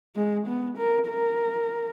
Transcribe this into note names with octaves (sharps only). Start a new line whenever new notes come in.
G#3
B3
A#4
A#4